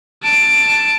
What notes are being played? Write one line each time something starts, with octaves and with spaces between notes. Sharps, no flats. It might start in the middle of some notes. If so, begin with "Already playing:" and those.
A5 D7